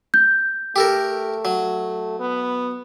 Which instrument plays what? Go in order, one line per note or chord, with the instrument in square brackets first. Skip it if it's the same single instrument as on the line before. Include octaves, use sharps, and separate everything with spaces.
[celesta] G6
[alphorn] A3 [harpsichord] G4 A4 A#4
[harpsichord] F#3
[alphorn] B3